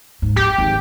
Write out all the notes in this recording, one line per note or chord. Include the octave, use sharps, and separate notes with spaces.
G#2
F2 G4
G#1